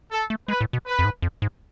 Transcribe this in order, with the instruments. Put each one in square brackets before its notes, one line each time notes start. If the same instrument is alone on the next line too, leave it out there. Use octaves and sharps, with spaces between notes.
[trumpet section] A4
[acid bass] A3
[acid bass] G#3 [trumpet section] B4
[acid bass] A2
B2
[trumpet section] B4
[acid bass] F2
G#2
F2
G#2